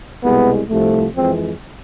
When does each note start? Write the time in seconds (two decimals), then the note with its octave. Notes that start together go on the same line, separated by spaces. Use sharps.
0.24 C2 B2 G#3 B3
0.69 C2 C3 F3 A3
1.15 F2 E3 G#3 C4